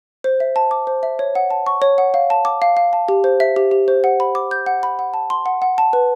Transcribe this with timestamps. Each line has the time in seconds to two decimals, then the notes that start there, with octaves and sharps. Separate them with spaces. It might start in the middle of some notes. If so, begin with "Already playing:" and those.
0.24 C5
0.40 E5
0.56 A5
0.71 D6
0.87 C5
1.03 E5
1.19 C#5
1.35 F#5
1.51 A5
1.66 C#6
1.82 C#5
1.98 F#5
2.14 F5
2.30 A5
2.45 D6
2.62 F5
2.77 F5
2.93 A5
3.08 G4
3.24 C5
3.40 E5
3.56 G4
3.71 G4
3.88 C5
4.04 F#5
4.20 B5
4.35 D6
4.51 G6
4.66 F#5
4.83 B5
4.99 F#5
5.14 A5
5.30 C6
5.46 F#5
5.62 F#5
5.78 A5
5.93 B4